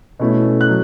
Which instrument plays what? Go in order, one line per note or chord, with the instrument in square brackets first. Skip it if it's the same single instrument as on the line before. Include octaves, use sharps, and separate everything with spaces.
[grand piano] B2 A3 C#4 E4
F#6
F#3